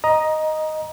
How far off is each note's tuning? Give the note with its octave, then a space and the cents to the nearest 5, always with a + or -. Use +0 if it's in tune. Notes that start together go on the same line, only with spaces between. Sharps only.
D#5 +0 A#5 +15 D#6 -5